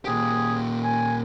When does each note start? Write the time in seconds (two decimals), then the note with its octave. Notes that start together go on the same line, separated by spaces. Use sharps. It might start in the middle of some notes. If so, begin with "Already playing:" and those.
0.05 A#2 G4 G#4
0.84 G#5